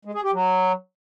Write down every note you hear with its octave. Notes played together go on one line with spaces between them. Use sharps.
G#3
G#4
G4
F#3